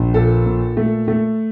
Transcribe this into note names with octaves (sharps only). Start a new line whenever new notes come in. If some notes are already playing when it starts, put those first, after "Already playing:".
Already playing: A#1
A#2 A4
A#2
A3
A3